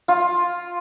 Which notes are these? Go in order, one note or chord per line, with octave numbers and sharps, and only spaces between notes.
F4